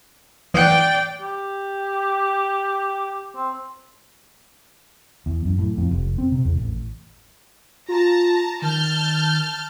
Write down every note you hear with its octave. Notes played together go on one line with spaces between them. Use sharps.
E3 D5 G5 F#6
G4
C4
E2
F#2
A2
F2
F1
C4
C3
E2
A1
F4 A5 A#5
D#3 A5 F6 G6